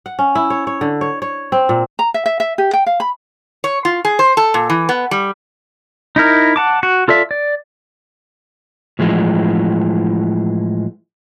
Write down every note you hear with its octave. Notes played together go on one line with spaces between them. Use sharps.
F#5
C#4
E4
C#5
C#5
D3
C#5
C#5
C4
A#2
A#5
E5
E5
E5
G4
G5
F5
B5
C#5
F4
G#4
C5
A4
A#2
E3
B3
G3
D#4 E4 A#4
F#5 A5 D6
F#4
F4 A4 D5 E5
D5
A2 E3 F3 G#3